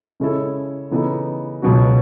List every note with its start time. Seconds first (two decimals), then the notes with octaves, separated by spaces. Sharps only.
0.20 C#3 G#3 C#4 E4 A4
0.91 C#3 E3 B3 D#4 A4
1.62 C#2 B2 F#3 C#4 F#4